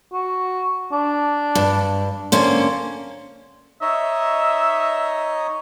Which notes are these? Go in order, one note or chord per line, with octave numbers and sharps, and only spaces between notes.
F#4
D4
G2
D3 A#3 C#4 C5
D#4 C#5 D#5 E5